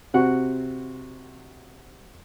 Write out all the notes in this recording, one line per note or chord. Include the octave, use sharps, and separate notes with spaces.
C3 C4 F#4 F#5